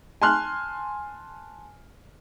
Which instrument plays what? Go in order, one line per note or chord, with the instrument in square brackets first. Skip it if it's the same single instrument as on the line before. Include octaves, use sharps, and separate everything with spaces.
[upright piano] G#5 A5 C6 F6 F#6